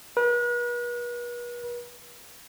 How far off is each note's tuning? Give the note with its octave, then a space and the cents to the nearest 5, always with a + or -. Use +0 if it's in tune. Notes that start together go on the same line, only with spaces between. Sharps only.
B4 -40